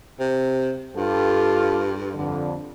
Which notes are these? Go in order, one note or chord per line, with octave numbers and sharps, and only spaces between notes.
C3
G2 F4 G4 A4
F2 D3